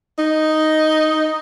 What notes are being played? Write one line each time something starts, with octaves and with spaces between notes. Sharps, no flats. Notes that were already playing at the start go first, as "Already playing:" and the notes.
D#4